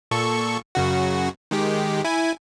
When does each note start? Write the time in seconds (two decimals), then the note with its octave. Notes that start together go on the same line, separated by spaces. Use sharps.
0.11 A#2 A4 C#6
0.75 F#2 C#3 F#4
1.51 D#3 G#3 G4
2.05 E4 G#5